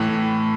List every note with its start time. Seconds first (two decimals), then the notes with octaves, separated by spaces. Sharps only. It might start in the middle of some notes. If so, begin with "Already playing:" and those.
Already playing: A2 E3